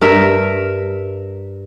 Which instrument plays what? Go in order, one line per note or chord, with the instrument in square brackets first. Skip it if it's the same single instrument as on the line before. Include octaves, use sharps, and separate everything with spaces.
[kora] G2 A#4 E5